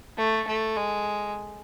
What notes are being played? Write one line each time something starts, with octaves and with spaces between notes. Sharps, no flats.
A3
A3
G#3